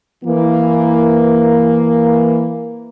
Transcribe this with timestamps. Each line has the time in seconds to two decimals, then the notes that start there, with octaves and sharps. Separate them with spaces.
0.25 E3 A#3